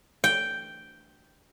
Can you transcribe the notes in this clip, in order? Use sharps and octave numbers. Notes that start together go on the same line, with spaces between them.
G5